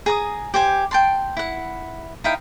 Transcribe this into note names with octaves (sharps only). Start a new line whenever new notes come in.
G#4 A#5 D#6
G4 C5 G#5
G5 A5 C6
E4 F#5
D#4 E4 F5 G5